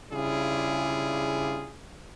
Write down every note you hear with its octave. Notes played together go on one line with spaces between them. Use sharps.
C#3 G3 D4 E4 F4 G#4